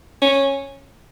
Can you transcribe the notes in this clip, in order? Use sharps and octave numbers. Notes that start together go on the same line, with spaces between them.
C#4